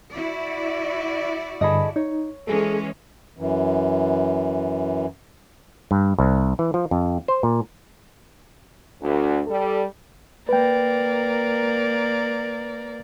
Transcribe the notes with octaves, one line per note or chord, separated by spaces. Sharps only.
E4 F#4 D5
G2 D3 G#4 A4 D#5 B5
D#4 C#5
E3 G#3 C#4 G#4 A4
F#2 E3
G2
C2
E3
F3
F2
C5
A#2
D2
G3 A4
A#3 A#4 B4 D5 G5